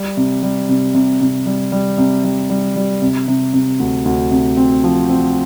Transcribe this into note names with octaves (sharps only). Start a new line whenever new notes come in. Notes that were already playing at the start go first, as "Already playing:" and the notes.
Already playing: G3
C3
G3
C3
C3
C3
G3
G3
C3
G3
G3
G3
C3
C3
C3
D2
D2
C3
C4
F3
C4